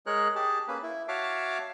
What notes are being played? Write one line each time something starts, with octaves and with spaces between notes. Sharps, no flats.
G#3 G#4 A#4 C#5 F#6
G4 G#4 A5
A#3 C#4 B4
E4
F#4 C#5 E5 F5 A5 D6